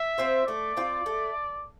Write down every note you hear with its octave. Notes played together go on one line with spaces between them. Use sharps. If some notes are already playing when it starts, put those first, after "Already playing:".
Already playing: E5
C4 F4 C5
A3 D5
C4 F4
A3